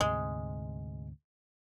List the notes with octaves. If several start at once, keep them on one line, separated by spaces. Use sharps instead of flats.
D2 G#2 C3 G#3